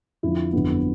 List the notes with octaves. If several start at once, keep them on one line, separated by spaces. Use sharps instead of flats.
F2 D3 F3 E4
G1 F2 D3 F#3 B3